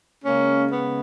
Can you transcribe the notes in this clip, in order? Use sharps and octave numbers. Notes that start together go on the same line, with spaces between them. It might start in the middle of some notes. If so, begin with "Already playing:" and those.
C#3 G#3 A#3 C#4
B3